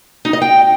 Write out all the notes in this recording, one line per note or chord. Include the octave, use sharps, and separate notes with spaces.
D#4
D#5
G5